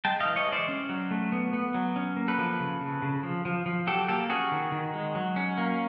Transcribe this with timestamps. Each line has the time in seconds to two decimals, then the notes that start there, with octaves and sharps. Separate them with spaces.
0.05 G#3 G5 A5
0.20 D#5 F5
0.25 E3
0.36 C#5 D#5
0.47 G#3
0.52 C5 D5
0.68 C#4
0.89 F#3
1.11 A3
1.32 B3
1.53 B3
1.74 F#3
1.96 C#4
2.17 A#3
2.28 A4 B4
2.38 F3
2.60 C#3
2.81 C#3
3.02 C#3
3.23 F3
3.45 F3
3.66 F3
3.87 F#3 G4 A4
4.08 A#3 G4 A4
4.30 C#4 F#4 G#4
4.52 D#3
4.72 D#3
4.94 G#3
5.15 F#3
5.36 C#4
5.58 A#3